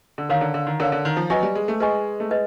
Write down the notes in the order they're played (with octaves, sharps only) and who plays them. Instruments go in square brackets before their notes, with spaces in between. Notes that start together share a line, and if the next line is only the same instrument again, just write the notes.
[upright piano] D3
[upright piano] D#3 [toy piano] A#4 C#5 F5
[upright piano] D3
D3
D#3
[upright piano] D3 [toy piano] A#4 C#5 F5
[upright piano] D3
D#3
F3
[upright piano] F#3 [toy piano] B4 D#5 G#5 C#6
[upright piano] G3
G#3
A3
[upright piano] G#3 [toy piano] B4 D#5 G#5 C#6
[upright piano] A3
[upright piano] G#3 [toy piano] B4 D#5